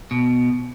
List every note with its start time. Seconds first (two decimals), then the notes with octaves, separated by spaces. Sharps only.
0.11 B2